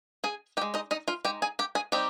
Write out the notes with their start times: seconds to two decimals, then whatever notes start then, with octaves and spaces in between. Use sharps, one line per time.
0.24 G#4 G#5
0.57 D#4 G4 G5
0.61 G#3
0.74 D#4 D#5
0.91 D#4 D#5
1.08 F4 F5
1.25 G#3 D#4 G4 G5
1.42 G#4 G#5
1.59 G4 G5
1.75 G#4 G#5
1.92 G3 C4 D#4 G4 G5